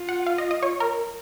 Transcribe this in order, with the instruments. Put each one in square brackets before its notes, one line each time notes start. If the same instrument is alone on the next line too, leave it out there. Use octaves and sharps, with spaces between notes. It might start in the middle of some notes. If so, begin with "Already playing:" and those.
Already playing: [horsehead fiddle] F4
[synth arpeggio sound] F#5
F5
D#5
D#5
C#5
A#4